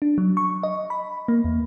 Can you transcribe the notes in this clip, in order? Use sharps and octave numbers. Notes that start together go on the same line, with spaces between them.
D4
F#3
C#6
D#5
B5
A#3
E2